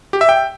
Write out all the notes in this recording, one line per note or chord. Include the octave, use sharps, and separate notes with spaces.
G4
E5
G5